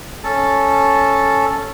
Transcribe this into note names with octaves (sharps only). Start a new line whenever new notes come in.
C#4 A4 A5